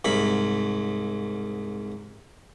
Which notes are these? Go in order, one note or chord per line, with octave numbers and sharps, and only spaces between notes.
C2 G#2 B5